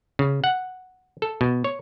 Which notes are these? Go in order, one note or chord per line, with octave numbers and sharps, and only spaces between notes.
C#3
F#5
A4
B2
C#5